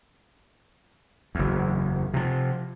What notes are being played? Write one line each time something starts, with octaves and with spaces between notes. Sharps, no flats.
F#1 E2
C3 F3